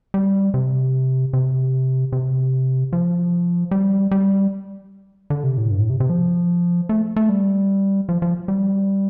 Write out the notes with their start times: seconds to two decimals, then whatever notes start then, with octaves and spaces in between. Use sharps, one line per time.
0.14 G3
0.54 C3
1.33 C3
2.12 C3
2.93 F3
3.71 G3
4.11 G3
5.30 D3
5.44 C3
5.58 A2
5.70 G2
5.80 A2
5.90 C3
6.00 C3
6.10 F3
6.89 A3
7.16 A3
7.29 G3
8.09 F3
8.22 F3
8.48 G3